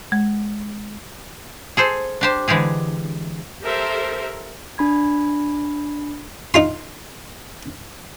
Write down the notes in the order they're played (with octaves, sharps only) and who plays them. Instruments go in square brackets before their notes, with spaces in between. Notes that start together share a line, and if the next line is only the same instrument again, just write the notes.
[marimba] G#3
[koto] G#4 A4 C5
D4 G4 C5
D3 E3 G#3 G4 G#4
[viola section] G4 A4 A#4 C5 E5
[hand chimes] D4 B5 G#6
[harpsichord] D#4 F4 C6